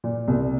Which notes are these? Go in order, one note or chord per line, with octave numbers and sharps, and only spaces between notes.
A#2
C2